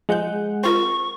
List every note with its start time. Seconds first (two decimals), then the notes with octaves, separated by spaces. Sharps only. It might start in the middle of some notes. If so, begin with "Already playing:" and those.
0.09 F3 G#3 F#5 G6
0.64 C4 F4 A#4 C#6